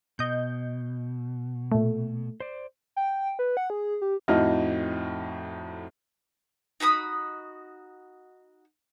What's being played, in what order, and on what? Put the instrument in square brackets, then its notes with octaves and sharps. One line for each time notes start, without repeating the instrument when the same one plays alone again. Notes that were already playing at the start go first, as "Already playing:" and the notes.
[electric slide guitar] B2 [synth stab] D#5 G6
[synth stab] A#2 A3
[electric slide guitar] C5 D5
[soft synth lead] G5
B4
F#5
G#4
G4
[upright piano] F2 A2 D#4 F#4 D#5 F6
[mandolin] D#4 F#4 B5 D#6